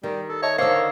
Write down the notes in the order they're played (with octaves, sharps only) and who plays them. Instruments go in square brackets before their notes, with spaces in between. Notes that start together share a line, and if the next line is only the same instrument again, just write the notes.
[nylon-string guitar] D#3 [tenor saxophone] G3
[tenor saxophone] A4
[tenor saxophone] C#5 [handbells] D#5 [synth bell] E5 A5
[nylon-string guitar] D3 D#3 [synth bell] A#4 C5 [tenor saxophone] C#5 [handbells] F5 D6 E6